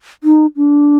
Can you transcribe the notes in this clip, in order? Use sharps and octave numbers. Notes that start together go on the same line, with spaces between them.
D#4
D4